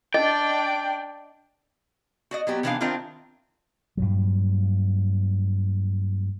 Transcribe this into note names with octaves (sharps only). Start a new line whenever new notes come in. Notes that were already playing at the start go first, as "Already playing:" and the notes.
D4 D5 D#5 G5
F#4 D5 D#5
F#3 B3 G4
C3 D#3 E3 B3 D4 F5
D#3 C4 D4 E4 F4 A#4
G2 A#2 F#3